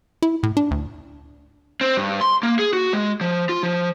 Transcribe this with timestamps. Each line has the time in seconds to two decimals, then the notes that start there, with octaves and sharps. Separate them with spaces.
0.22 E4
0.43 A2
0.57 D4
0.71 D2
1.81 C4
1.97 G2
2.21 C6
2.43 A#3
2.59 G#4
2.73 F#4
2.93 G#3
3.21 F3
3.49 F4
3.63 F3